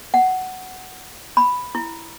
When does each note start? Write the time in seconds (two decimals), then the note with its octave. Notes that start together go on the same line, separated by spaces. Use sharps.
0.14 F#5
1.37 B5
1.75 E4